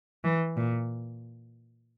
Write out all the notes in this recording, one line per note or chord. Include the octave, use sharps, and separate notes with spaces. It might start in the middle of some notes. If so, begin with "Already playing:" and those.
E3
A#2